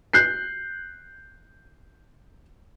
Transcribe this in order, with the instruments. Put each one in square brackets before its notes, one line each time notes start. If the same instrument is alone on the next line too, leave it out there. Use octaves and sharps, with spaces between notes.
[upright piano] F#6 G6 C7